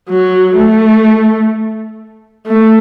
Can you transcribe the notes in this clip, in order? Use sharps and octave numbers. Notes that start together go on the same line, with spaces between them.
F#3
A3
A3